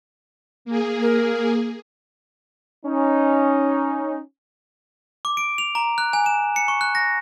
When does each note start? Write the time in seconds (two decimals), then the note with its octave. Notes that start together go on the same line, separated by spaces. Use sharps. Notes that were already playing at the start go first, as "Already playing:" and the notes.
0.65 A#3 G#4
1.02 A#4
2.86 C#4 D#4
5.25 D6
5.37 D7
5.58 F7
5.75 A#5
5.98 F#6
6.13 G#5
6.26 E7
6.56 C#7
6.68 C#6
6.81 F#6
6.95 A#6